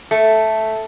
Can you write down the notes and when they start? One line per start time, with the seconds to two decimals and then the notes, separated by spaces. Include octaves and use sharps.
0.11 A3